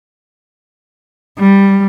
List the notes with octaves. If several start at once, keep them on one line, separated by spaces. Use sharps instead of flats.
G3